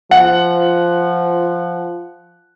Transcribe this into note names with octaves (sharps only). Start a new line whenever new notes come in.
F3 F#5